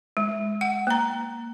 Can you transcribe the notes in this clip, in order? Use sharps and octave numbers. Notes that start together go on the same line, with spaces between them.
G#3
F#5
A#3 A#5